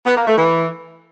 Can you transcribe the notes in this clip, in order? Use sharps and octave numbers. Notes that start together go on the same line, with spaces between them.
B3
A#3
A3
E3